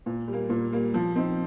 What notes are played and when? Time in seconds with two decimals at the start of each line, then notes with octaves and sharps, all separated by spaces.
0.06 A#2
0.28 G3
0.33 A#3
0.50 A#2
0.73 G3 A#3
0.94 F3
1.16 C4 D#4